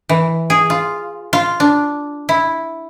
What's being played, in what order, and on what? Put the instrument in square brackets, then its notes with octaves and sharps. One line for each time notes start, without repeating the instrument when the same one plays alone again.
[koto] E3
G#4
F4
F4
D4
E4